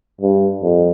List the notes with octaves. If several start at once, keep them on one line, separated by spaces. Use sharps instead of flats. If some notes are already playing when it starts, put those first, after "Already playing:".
G2
F2